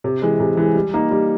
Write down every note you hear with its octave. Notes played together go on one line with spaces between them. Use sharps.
C3
E3 G#3
C3
E3 G#3
G3
A#3 D#4
G3